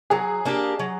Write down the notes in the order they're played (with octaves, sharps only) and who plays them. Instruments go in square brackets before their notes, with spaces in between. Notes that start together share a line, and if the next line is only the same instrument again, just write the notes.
[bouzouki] F#3 [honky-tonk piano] G#4
[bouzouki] A#3 D4 G4
F#3